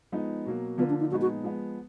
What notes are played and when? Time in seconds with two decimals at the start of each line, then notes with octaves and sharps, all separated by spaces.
0.12 F3 G#3 B3 D#4
0.46 B2 F#3 A#3
0.78 D3 F3 A#3 B3 F4
0.89 D4
1.00 D#4
1.11 A#2 F3 G#3 B3 D#4 F#4
1.21 F#4
1.43 F3 G#3 B3